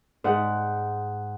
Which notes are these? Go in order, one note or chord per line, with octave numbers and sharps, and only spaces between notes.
G#2 F#5